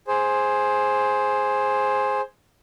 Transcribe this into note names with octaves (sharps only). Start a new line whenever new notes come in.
G#4 C5